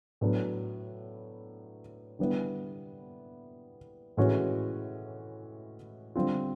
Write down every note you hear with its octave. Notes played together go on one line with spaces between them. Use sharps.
A2 F#3 B3 D4
D3 G3 B3 E4
A2 E3 G#3 C#4 F#4
D3 G3 C4 F4